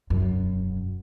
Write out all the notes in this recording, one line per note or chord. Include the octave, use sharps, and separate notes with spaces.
E1 F#2